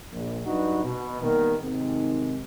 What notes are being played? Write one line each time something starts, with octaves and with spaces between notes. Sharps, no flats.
A#1
G2 F#3 D4 D#4 F#4 B4
B2
D#3 G3 A#3 B3 A#4
G#2 C3 D#3